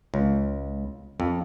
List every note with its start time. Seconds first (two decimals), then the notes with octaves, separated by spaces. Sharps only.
0.14 C#2
1.20 F2